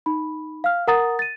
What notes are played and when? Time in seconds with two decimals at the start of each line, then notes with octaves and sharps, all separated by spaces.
0.06 D#4 B5
0.64 F5 F6
0.87 A#4 F#5 A#5 D#6 A6
1.19 A6 D#7